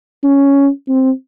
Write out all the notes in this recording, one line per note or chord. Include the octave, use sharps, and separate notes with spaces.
C#4
C4